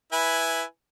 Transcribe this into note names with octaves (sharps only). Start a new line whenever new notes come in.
E4 B4 G#5